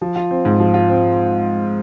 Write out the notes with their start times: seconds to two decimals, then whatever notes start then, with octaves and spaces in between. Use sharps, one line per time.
0.01 F3
0.16 F4
0.31 C4
0.45 G#2
0.60 F3
0.74 F4
0.89 C4